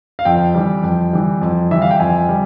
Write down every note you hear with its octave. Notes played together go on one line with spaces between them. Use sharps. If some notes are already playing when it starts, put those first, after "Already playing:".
F5
F2 G5
E3 G3
F2
E3 G3
F2
E3 G3 E5
F5
G5
F2 G#5
G3